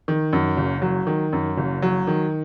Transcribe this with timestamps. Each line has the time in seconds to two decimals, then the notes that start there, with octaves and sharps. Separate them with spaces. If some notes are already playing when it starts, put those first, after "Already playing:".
0.08 D#3
0.33 F#2
0.57 F#1
0.82 F#3
1.07 D#3
1.33 F#2
1.58 F#1
1.82 F#3
2.08 D#3